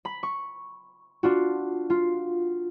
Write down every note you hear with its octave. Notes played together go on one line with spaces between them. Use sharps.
B5 B6
C#6
D4 F4 F#4
F4